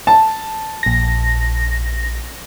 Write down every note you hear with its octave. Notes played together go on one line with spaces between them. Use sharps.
A5
A#1 A#6